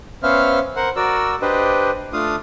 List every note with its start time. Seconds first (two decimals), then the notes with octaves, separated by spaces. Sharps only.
0.23 B3 C#4 C5 E5 F5 F6
0.76 A#4 C5 F#5
0.96 F#4 A#4 D5 E6
1.42 D4 G4 B4 C5 D#5
2.13 A3 D4 F4 F5 D#6